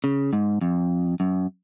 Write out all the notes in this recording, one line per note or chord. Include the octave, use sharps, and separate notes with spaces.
C#3
G#2
F2
F#2